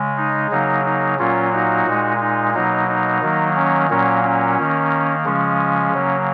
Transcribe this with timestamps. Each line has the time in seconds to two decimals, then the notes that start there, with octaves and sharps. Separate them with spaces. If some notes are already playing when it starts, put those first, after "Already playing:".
Already playing: C#3 G#3
0.17 D#4
0.51 C#3 F#3 A#3 D#4
0.85 D#4
1.19 A#2 F#3 A#3 C#4 F4
1.53 D#4 F#4
1.87 A#2 G#3
2.20 D#4
2.54 B2 F#3 A#3 D#4
2.88 D#4
3.22 D#3 F#3 A#3
3.56 C#4
3.90 A#2 F#3 A#3 C#4
4.24 C#4
4.58 D#3 A#3
5.25 C#3 F3 G#3 C#4
5.93 C#3 F#3 A#3